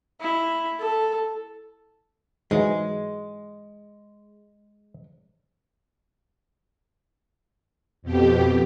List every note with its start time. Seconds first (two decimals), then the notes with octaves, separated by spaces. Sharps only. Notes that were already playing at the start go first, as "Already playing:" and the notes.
0.20 E4
0.79 A4
2.51 G#2 E3 F#3 G#3
8.02 F2 B2 G4